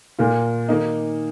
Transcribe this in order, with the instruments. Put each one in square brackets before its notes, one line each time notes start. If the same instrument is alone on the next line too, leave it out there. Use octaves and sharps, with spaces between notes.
[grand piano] A#2 A#3 F4
D#3 A#3 D#4